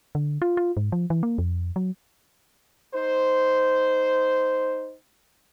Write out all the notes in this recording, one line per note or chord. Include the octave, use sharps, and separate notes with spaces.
D3
F4
F4
G#2
F3
E3
A#3
F2
F#3
D#4 C5